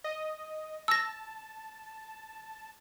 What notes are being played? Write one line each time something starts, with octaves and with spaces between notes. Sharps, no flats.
D#5
A5 E6 A#6